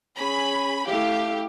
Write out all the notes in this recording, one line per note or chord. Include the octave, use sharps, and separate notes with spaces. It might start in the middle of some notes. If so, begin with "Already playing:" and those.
C#4 G#4 B5
A3 E4 G4 F5